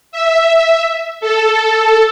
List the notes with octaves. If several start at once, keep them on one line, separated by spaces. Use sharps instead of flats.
E5
A4